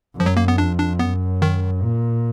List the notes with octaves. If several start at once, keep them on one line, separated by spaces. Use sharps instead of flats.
F#2 F3
F#3
A#3
B3
F2 D4
D4
F#2 B3
D#3
A#2